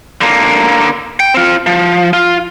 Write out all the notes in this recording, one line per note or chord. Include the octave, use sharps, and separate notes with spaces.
D3 A#3
G5
C4 F4
F3
F4